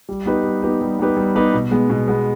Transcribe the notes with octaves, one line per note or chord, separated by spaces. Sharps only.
G3
B3 D#4 G4 B4
G3
B3 D#4 G4 B4
G3
B3 D#4 G4 B4
G3
B3 D#4 G4 B4
B2
G#3 B3
B2
G#3 B3